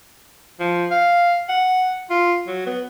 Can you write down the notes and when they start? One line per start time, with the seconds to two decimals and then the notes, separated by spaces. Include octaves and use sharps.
0.60 F3
0.91 F5
1.49 F#5
2.10 F4
2.47 F#3
2.66 B3